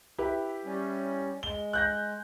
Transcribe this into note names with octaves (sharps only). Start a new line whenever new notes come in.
E4 G4 B4
G3 C#4
G#3 G7
F#6 G6 A#6